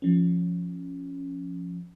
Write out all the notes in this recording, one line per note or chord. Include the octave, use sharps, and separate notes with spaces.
F3 C#4